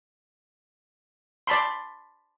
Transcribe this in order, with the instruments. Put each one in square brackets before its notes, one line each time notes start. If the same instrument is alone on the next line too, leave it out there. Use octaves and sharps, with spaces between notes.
[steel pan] D5 A5 B5 C6